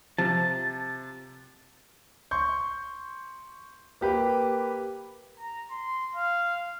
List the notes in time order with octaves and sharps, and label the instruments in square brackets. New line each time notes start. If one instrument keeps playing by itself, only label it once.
[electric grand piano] C3 [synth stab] F3 [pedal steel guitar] A5
[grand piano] C6 C#6 G6
A#3 G4 B4
[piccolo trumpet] A#5
C6
F5